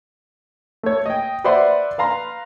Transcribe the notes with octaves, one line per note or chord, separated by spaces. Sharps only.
A3 C#5
D#5 G5
B4 C5 D5 E5 F#5 C6
B4 F5 A#5 C6